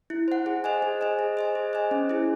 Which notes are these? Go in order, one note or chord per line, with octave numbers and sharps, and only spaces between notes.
E4
C5 F#5
G#4
C5 D#5 G#5
G#4
C5 D#5 G#5
G#4
C5 D#5 G#5
G#4
C5 D#5 G#5
C#4
E4 G#4